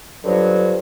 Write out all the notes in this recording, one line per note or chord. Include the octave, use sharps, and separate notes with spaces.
G2 D3 F3 F#3